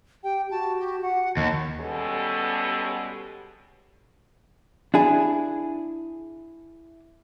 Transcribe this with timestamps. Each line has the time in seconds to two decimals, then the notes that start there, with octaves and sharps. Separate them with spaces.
0.24 G4 G5
0.51 F#4 A5
0.79 G4
1.02 F#5
1.37 D#2 A5
1.80 B2 G3 G#3 B3 C#4 A4
4.94 D4 E4 G#4